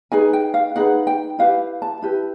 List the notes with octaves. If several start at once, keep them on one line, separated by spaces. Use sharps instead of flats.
D#4 G#4 B4 G#5
G5
F5
D#4 G#4 B4 F#5
G5
E4 G4 B4 F5
A5
E4 G4 B4